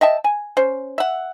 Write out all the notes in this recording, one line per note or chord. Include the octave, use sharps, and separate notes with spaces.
D#5 E5 G5 A5
G#5
C#4 C5
E5 F#5